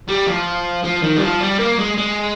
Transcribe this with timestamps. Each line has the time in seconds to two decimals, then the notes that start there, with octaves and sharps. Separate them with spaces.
0.08 G3
0.27 F3
0.84 F3
1.02 D#3
1.16 G3
1.22 F3
1.41 G3
1.59 A#3
1.79 G#3
1.98 G#3